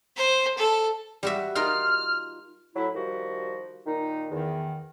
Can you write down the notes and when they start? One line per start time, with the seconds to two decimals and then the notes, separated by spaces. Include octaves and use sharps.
0.17 C5
0.58 A4
1.23 G3 F#4 E5
1.55 D#4 F4 A#4 F6
2.76 A2 F#3 E4
2.95 D#3 F3 G3 F#4 G4
3.86 A#2 D#3 D#4
4.31 E2 D#3